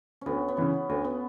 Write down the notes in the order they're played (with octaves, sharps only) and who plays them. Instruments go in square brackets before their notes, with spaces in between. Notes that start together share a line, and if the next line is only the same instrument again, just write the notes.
[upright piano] D2 [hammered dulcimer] B3 C#4
[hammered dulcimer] B3
[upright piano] C#3 E3 [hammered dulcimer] C#4
[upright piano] D2 [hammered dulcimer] B3
[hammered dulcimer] B3